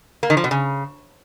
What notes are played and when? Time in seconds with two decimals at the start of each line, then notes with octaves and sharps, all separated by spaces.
0.23 A#3
0.30 D#3
0.37 F3
0.44 B2
0.51 C#3